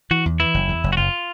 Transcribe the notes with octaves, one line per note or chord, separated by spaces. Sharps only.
E3 F#4
E2
E3 E4
F#1
E2
F#1
F#4
F#1 F4